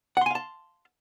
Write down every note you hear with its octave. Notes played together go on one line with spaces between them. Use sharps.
F5 F#5 G#5 A5 C6